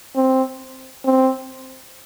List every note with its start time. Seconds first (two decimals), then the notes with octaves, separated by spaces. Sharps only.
0.16 C4
1.05 C4